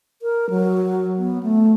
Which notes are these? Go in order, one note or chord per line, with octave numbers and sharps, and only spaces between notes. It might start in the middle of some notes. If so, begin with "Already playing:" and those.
A#4
F#3
B3
A3